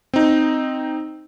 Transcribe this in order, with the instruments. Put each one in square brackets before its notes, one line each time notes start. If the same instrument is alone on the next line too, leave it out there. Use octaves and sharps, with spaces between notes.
[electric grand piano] C4 D#4